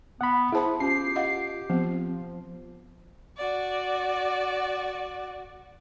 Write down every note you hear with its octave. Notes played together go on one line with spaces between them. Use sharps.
B3 F#5 B5
B3 E4 G#4 C5 A5 B5
C#4 F4 G4 C7
D#5 F5 F#5
F3 B3 C4
F#4 D5